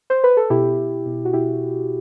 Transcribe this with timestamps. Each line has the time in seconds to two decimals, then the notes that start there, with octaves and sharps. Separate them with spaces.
0.10 C5
0.24 B4
0.37 A4
0.50 B2 E4 G4
0.78 B2
1.06 B2
1.25 F#4
1.33 B2 E4 G4